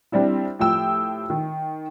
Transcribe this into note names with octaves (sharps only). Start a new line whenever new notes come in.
G3 C4 D4 E4
A2 F3 G4 G5 E6
D#3